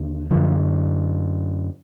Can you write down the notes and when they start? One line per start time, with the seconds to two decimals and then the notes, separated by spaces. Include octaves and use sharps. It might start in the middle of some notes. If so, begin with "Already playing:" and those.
Already playing: D#2 D3
0.31 F#2 D3 F3